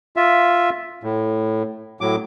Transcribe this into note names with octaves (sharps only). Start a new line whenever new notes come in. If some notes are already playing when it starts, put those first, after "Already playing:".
F4 E5
A2
A2 F#3 D6